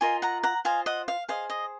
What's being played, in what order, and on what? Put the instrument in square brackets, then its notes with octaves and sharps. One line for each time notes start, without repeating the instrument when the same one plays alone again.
[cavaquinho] F4 A#4 D#5 G#5 C6
F#5 A#5
F#5 A#5
F4 C5 D#5 F5 G#5
D#5 F#5
F5
G#4 C5 D#5 F5
D#5